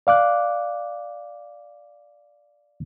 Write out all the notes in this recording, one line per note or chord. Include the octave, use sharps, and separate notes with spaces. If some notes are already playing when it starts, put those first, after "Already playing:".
D5 F5 D6 F#6